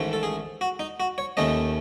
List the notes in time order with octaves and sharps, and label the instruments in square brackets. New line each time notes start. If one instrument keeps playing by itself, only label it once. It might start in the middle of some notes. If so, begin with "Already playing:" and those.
Already playing: [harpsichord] A1 G#2 D#3 A3 C#4
A4
G#4
F#4
D#4
F#4
C#5
D#2 D#3 A3 C#4 D#5